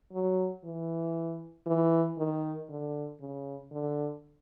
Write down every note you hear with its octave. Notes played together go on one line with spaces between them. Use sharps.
F#3
E3
E3
D#3
D3
C#3
D3